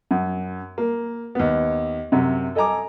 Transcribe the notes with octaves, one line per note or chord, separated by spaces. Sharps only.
F#2
A#3
D#2 B3
F#2 C3
A4 D#5 G#5 A#5 D6